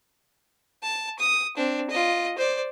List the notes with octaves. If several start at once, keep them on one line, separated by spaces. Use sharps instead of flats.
A5
D#6
C4 D4
F4 D#5
C5 D5